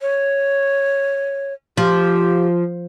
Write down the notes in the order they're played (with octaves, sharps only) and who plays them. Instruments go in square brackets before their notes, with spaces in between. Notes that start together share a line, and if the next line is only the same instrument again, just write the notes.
[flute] C#5
[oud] F3 [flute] G4